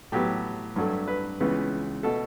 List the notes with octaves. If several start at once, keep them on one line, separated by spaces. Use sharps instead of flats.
A2 F#3 B3 G4
G2 F#3 A3
B4
C#2 C#3 E3 B3
B2 A3 A4